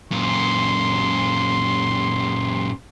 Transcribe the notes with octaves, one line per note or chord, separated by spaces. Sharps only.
F#2 A#2 C6